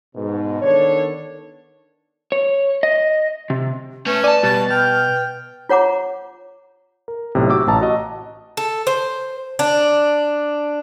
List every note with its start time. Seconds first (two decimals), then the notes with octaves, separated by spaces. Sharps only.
0.16 G#2 B2
0.62 D#3 B3 D4 A4 C#5
2.32 C#5
2.83 D#5
3.50 C3
4.06 A3 C#4 B4 E5
4.24 D5 G#5 A5
4.43 B2 G3 A5
4.71 G5 F6
5.69 F4 C#5 F#5 A#5 D6
7.08 A#4
7.35 B1 A2 C3
7.50 F#4 G4 F#5 D6 E6
7.67 A1 A5 A#5
7.81 F#4 D#5
8.57 A4
8.87 C5
9.59 D4